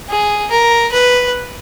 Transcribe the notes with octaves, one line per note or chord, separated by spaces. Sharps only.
G#4
A#4
B4